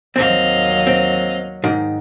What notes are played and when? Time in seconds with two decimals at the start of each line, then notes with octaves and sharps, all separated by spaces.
0.16 D#2 F#3 C4 D#5 F5
0.87 C4
1.64 G#2 D#3